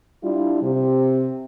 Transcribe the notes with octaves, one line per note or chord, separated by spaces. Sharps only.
G3 D4 E4 F4
C3